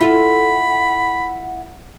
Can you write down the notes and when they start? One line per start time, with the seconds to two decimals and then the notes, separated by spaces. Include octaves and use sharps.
0.01 E4 F4 A4 F#5 B5